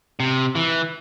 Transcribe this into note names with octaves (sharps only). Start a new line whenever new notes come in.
C3
E3